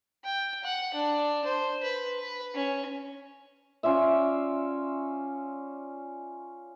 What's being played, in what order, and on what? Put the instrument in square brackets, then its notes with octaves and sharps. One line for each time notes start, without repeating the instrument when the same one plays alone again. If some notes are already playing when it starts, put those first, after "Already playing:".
[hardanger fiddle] G5
F#5
D4
C5
B4
B4
C#4
[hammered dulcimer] C#4 F4 D5 E5